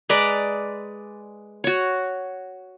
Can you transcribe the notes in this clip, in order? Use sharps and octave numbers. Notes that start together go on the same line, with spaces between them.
G#3 B4 D5 A#5
F#4 C#5